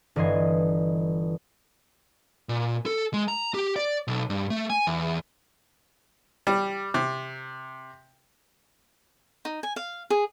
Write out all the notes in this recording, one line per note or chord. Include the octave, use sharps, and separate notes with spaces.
G1 E3 D#5 C6 G#6
A#2
A4
G#3
A#5
G4
D5
B1
G2
A3
G#5
E2
G3
C3
D#4
G#5
F5
G#4